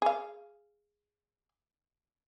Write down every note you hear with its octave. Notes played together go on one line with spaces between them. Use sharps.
G#4 F5